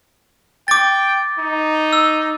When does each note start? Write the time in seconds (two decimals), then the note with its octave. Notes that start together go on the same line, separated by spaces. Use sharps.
0.68 G5 D6 A6
1.39 D#4
1.93 E6